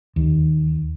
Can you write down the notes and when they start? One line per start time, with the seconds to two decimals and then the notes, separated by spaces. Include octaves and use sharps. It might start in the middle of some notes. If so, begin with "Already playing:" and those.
0.16 D#2